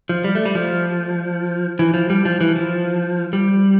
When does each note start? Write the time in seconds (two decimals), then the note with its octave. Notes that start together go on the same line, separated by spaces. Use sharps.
0.09 F3
0.24 G3
0.35 A3
0.45 G3
0.55 F3
1.79 E3
1.94 F3
2.10 G3
2.25 F3
2.41 E3
2.56 F3
3.33 G3